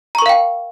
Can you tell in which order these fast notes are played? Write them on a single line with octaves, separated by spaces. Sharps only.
A#5 C#6 A#4 F5 G5